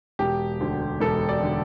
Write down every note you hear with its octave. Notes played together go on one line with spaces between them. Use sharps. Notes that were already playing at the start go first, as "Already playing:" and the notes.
E1 G4
D2 D3
E1 A4
D5
D3